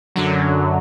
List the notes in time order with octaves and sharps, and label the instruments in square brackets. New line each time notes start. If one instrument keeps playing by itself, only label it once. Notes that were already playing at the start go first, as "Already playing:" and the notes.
[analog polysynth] F#2 D3 F#3